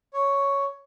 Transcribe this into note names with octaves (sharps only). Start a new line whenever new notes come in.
C#5